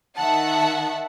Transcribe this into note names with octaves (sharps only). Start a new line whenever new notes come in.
D#3 E5 F#5 A5